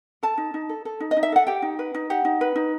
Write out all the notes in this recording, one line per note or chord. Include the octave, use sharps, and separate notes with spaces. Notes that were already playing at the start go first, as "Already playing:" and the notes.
A4 A5
D#4
D#4
A4
A4
D#4
D#5
D#4
E5
A4 F#5
G4 G5
D#4
B4
D#4
G4 F#5
D#4
B4
D#4